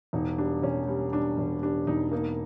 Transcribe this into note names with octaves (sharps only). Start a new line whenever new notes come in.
E1 D#4
G3 D4
E1 C#4
G3
G3 D4
E1
G3 D4
E1 D#4
A#3 D#4